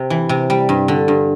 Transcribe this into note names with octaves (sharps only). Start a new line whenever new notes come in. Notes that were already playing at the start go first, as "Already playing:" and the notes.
Already playing: C3
E3
C3
G3
G2
D3
G2